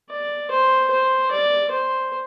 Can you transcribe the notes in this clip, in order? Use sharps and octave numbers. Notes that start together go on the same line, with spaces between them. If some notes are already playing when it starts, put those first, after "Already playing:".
D5
C5
C5
D5
C5